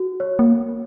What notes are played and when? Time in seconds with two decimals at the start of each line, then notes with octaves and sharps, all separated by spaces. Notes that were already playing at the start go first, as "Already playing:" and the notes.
Already playing: F#4
0.20 C#5
0.39 A#3